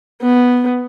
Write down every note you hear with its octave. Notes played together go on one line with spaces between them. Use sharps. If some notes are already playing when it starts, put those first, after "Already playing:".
B3